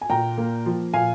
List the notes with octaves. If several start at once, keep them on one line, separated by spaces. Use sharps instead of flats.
G#5
A#2 G5 A#5
A#3
F3
A#2 F5 G#5